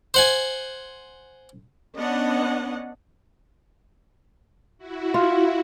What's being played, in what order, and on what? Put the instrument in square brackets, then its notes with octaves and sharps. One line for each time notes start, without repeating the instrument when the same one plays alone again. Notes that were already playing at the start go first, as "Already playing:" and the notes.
[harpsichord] C5 F#5 G#5
[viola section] B3 C#4 D4 D#5 F#5
[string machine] E4 F#4
[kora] F4